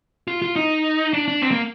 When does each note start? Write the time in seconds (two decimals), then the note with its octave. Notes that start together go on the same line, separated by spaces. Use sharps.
0.28 F4
0.42 F4
0.56 D#4
1.13 D4
1.28 D4
1.42 C4
1.51 A#3